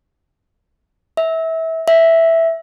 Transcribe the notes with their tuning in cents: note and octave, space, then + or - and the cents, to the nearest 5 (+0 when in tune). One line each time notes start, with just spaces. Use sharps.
E5 -25
E5 +0